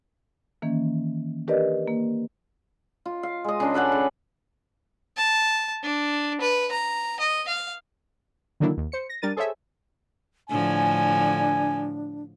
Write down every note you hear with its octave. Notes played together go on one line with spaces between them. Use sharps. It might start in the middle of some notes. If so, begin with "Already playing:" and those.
D#3 E3 A#3 C#4
D4 G4 A#4 B4 D5 D#5
A#3
F4
F5
G#3 D#5
C#3 D4 A#4
A4 B4 D5 F#5
C#3
A5
D4
B4
A#5
D#5
F5
D3 D#3 F#3 A#3 D4 E4
D#2
C5 C#7
A#6
G3 D4 A#4 A6 D#7
G#4 A4 C5 C#5 E5 G#5
A2 D3 F3 D4 G#5